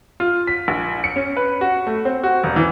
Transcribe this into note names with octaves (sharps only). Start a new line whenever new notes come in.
F4
B6
A#1
C#7
C#4
B4
F#4
A3
C4
F#4
E1
E3